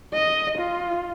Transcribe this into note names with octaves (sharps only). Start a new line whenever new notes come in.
D#5
F4